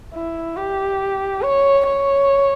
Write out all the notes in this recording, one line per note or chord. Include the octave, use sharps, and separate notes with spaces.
E4
G4
C#5
C#5